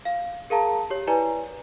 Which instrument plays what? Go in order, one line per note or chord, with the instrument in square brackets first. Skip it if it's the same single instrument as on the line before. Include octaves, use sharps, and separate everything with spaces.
[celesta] F5
G#4 A#4 F5 A5 A#5
G4 C#5
E4 B4 D5 G#5 A#5